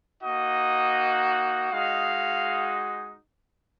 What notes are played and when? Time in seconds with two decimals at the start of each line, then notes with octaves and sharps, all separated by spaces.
0.23 A#3 D#4 F#4 D#5
1.71 G#3 D#4 F#4 F5